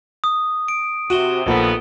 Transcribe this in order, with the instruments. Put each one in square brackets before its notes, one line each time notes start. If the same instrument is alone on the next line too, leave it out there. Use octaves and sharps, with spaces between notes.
[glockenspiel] D#6
D7
[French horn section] C3 [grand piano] F#4 [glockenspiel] D#7 E7 G7
[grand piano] A#1 A#3 A4 [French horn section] D#3 F3 B3